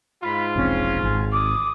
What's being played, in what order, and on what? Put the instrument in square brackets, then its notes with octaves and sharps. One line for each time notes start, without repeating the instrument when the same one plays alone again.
[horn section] G#2 F4 [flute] B5
[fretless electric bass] E1 A#1 C4 [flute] C#4
[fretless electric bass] G#1 [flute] G#5
[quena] D6 [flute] D#6